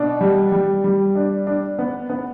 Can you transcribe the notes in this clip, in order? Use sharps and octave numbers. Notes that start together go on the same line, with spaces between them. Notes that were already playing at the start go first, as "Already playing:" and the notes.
Already playing: B2 D4
G3
G3
G3
D4
D4
B3
B3